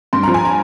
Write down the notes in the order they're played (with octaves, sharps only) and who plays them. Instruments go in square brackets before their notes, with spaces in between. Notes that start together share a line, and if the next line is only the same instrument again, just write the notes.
[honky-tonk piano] G2 C6
F3 A#5
G#5
A#5